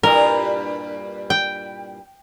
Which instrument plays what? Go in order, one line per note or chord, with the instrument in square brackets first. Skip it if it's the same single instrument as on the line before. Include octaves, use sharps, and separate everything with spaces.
[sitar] G2 A#2 E4 [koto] A#4
[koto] G5